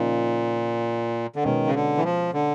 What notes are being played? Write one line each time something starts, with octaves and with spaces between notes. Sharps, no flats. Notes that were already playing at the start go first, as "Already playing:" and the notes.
Already playing: A#2 C#3 F3 A#3 D#4
D3
B2 D#3 G#3 C#4
C#3
D3
E3
F3
D3